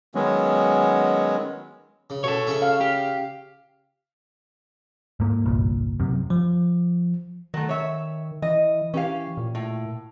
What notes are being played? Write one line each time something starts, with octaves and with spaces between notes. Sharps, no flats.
D#3 F#3 G#3 B3 C#4
C#3
B2 A4 C#5
C#3 C#4 E5
F5
G4
G#2 A#3
G1 C2 A#2
F#2 C3
F3
D#3 F#3 A3
C#5 E5
E3 D#5
E3 C#4 G4 F5
A#2
A2